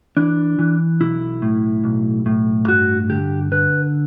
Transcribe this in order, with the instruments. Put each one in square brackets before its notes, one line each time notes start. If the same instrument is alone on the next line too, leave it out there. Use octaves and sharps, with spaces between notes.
[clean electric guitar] E3 D4
E3
B1 E4
A2
B1
A2
G2 F#4
D3 G4
D3 B4